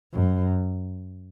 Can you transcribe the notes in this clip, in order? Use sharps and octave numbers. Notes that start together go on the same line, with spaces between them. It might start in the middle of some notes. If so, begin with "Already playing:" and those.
F#2